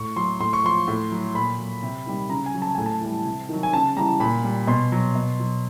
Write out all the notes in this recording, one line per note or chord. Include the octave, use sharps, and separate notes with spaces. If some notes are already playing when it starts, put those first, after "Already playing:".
Already playing: A2 C#6
F#3 C6
A2 C6
C#6
F3 C6
A2
F#3
A#2 B5
F#3
C3
D#3 G3
C#3 A#5
G#5
F#3
A5
A2 G#5
A5
E3 G3
C3
D#3 F#3
G#5
C#3 A5
E3 G3 A#5
A#2 B5
G3
B2 C6
F#3
B2
F#3